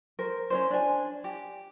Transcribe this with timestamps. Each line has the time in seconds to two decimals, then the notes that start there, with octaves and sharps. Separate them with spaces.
0.19 A#4 C5
0.50 C#4 D4 C5
0.71 D4 G#5
1.24 G4